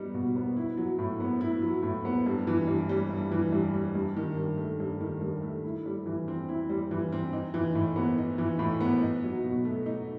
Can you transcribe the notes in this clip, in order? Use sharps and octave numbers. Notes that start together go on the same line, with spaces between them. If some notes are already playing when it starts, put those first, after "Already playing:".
Already playing: G3 B3 D#4
B2
B3
E4
F#3
A2
B3
E4
F#3
A2
B3
G2
E3
G2
G3
G2
E3
G2
G3
G2
D#3
G2
A3
G2
D#3
G2
A3
E4
G3
E3
C4
E4
G3
E3
C4
D#4
E3
A2
B3
D#4
E3
A2
B3
D#4
F#3
B2
A3
D#4